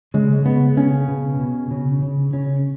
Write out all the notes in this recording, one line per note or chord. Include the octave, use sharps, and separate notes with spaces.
C#3 G#3
C#3 B3
C#3 C#4
B2
B2
C#3
C#3
C#3 C#4